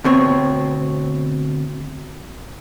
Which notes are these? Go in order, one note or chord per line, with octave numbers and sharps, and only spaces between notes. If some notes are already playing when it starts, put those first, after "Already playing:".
D2 B2 C4 C#5